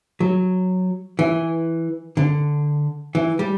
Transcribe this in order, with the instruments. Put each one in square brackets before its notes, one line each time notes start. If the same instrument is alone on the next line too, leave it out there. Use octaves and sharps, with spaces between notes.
[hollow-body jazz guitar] F#3
E3
D3
E3
G3